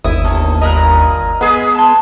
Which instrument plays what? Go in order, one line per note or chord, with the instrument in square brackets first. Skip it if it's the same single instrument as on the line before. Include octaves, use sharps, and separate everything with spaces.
[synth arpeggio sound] G1 D#2 D#6 [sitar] E4
[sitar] F#2 C3 [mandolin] A4 C#5 F6
[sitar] A#2 A#4 D#5 [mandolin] A#5 B5 F#6
[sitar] G#3 G#4 B4 [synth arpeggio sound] B3
[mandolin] A5 C6